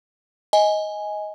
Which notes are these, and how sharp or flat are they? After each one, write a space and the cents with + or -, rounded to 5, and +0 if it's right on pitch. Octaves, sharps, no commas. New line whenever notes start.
D#5 +15 G#5 +0